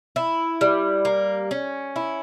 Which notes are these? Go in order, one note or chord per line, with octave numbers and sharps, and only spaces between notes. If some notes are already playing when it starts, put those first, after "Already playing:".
E4
G3
A#3
C#4
E4